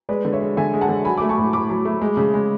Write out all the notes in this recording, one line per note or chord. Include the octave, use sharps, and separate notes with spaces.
G#3 B4 D5
D3
C#5 E5
G#3
D3 E5 G#5
G#3
F#5 A5
D3
F#3 G#5 B5
A3 D6
A5 C#6
A2
A2 B5 D6
F#3
A3
G#3
C#3
G#3